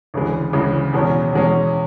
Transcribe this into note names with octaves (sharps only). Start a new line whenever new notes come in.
D2 C#3 E3 G#3
D2 C#3 E3 G#3
E2 B2 G#3 C#4
E2 B2 G#3 C#4